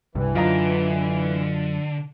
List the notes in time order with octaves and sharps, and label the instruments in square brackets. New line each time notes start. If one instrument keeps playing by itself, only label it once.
[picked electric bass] C2 G2 [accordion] E3
[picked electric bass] F#2 [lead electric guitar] D3 [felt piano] F4 D#5 A#5